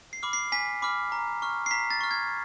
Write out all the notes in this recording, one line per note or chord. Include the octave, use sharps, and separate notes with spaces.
C7
B5 D6 F6
C7
G#5 B6
B5 D6 F6
A#5
C#6 F6
C7
A#5 B6
A6
C#6 F6
G#6